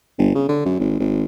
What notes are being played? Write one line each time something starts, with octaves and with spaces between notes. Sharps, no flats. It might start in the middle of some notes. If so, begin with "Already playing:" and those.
G1
C#3
D3
F#2
G#1
G#1